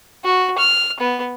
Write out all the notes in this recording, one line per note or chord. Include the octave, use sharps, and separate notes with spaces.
F#4
F6
B3